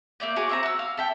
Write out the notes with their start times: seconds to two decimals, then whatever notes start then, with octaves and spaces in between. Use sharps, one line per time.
0.20 A#3 E4 D5 G6
0.36 F#4 G#4 C#5 D6
0.49 C4 E5 A#5
0.63 F#4 E6
0.79 F5
0.97 A4 E5 G5